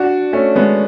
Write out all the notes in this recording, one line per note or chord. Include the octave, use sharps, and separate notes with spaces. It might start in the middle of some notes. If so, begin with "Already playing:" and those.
Already playing: D4 F#4
A3 C#4
G#3 B3